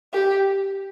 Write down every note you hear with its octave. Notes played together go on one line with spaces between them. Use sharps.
G4